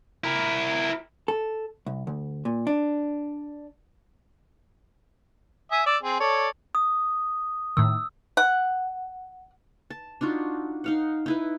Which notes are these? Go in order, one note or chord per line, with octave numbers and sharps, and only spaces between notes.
E4 A#4
A4
C2
D2
A#2
D4
E5 G#5 D#6
D5 E6
C4 G#4
A4 C#5 D5
D#6
A2 D#3 E6
F#5
A5
D4 D#4 F4 F#4
D#4 F5 F#5
D#4 E4 B4